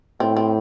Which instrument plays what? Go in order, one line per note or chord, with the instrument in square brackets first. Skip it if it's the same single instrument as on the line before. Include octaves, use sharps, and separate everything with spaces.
[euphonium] A2 [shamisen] C4
[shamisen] C4